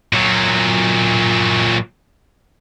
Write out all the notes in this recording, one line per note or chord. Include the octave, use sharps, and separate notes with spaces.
A#2 F#3